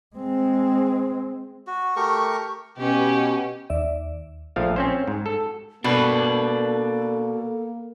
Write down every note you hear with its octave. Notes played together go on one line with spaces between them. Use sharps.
G#3 C4
F#4
A3 G4 A#4 C#6
B2 C#4 G4
D#2 D5 E5
A#1 F3 A3 F5
C4 C#4 C5
G#2
A4
B2 A#3 D4 A4 B4